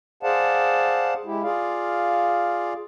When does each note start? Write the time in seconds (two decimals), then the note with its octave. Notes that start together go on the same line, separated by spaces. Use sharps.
0.23 G#4 C5 D5 F5 F#5 A5
1.25 G#3 E4 G4
1.43 F4 G#4 D5 F5